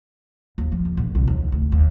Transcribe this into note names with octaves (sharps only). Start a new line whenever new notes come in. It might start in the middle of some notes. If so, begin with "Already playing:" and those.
D#2
F3
F2
A#1
C2
D#2
D2
D#2